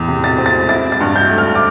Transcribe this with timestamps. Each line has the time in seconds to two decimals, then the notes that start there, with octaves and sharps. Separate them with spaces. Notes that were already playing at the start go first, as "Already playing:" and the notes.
Already playing: E2 A2
0.08 C3
0.24 A6
0.38 C4
0.46 A6
0.69 E4 A6
0.92 A6
1.00 G2
1.16 G6
1.30 A3
1.38 F6
1.55 D6